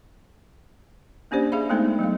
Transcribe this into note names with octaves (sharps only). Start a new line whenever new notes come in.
A#3 C#4 D4 G4 C5 D5
G#4 E5 F5 B5
G#3 A3 B3 D#4 A4 C5
F#3 B3 F5